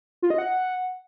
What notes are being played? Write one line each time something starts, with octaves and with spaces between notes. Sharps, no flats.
F4
D#5
F#5